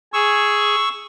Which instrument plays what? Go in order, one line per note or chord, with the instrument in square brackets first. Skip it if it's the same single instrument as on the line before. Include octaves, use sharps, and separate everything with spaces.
[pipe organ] G#4 [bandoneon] C#6 E6